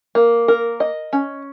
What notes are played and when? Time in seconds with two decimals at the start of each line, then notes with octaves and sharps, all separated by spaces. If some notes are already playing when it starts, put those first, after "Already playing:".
0.15 A#3
0.48 A#4
0.80 D#5
1.13 C#4